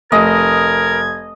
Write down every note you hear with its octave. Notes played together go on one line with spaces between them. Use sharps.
F1 A#4 D#5 G#6